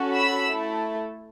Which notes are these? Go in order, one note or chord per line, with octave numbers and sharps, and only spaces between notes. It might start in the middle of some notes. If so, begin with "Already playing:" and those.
Already playing: C#4 F#4 A4
B5 E6
A3 E4 A4